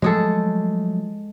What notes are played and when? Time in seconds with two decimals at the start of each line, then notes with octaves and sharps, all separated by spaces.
0.02 F3 F#3 G#3 A3 G#4 A4